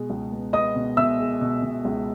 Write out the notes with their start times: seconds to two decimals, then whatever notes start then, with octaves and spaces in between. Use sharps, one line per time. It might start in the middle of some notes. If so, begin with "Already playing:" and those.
Already playing: B2 G#3
0.10 C#2
0.32 B3
0.53 B3 D#5 D#6
0.76 B2
0.97 B2 E5 E6
1.19 G#3
1.41 B2
1.62 B2
1.85 C#2